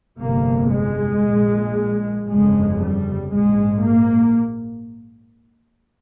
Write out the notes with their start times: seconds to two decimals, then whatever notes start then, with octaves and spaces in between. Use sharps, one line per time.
0.19 G1 F2 C3 A#3
0.72 G#3
1.23 A#1 A#2
2.27 G1 F2 C#3 G#3
2.79 G3
3.31 A#1 G#2 G#3
3.83 A#3